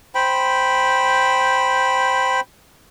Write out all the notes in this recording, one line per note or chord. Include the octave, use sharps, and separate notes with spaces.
C5 G5 B5